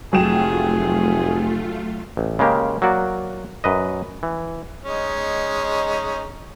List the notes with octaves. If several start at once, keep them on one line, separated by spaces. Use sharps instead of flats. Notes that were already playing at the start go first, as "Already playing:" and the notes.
F1 F#3 A3 F4 G#4 G5 E7
A1
C#3 G#3 A#3 G4
F#3 A#3 F#4 D5
F#2 B4 D#5
E3
G#3 C#4 D#4